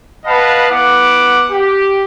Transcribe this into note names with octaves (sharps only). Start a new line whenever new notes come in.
B4 D#5 F5 F#5 A5 B5
B3 E4 F#5 D6
G4